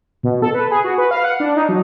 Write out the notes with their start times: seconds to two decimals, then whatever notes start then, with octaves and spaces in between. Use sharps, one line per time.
0.23 B2
0.42 A4
0.54 B4
0.71 G#4
0.84 F#4
0.98 B4
1.11 F5
1.24 F#5
1.40 D4
1.57 D#4
1.69 F#3